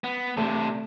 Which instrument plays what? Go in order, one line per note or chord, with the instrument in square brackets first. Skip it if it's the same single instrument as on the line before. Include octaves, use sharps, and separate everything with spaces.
[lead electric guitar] B3
[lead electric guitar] C3 D4 [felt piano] A3